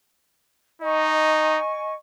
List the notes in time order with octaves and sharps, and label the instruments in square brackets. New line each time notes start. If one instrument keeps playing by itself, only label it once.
[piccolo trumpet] D#4 [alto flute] D#5 [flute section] G#5 C#6